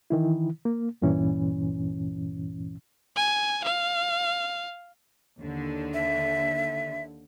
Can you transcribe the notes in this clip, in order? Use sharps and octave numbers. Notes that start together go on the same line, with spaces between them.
D#3 E3 E4
A#3
C#2 G2 A#2 E3 C#4
G#5
F5
D#2 D3
E5